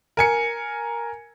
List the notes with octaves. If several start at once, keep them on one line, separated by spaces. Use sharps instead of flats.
A#4 G#5 C#7